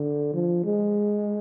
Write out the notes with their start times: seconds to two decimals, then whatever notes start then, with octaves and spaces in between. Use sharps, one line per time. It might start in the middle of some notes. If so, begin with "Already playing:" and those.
Already playing: D3
0.33 F3
0.64 G#3